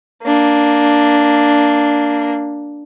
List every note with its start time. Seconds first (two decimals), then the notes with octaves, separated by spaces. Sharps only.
0.23 A#3 D4